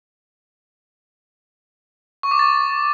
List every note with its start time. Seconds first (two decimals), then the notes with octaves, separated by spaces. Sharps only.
2.23 C#6
2.31 D6
2.39 A6